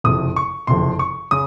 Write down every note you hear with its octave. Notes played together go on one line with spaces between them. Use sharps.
F#1 F2 C3 D#6
C#6
F#1 F2 C3 C6
C#6
C#3 D#6